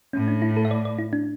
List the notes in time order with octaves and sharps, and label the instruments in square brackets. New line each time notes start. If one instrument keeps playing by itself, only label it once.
[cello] A2 [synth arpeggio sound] C#4
[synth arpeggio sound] D4
E4
A4
E5
D5
D5
E4
D4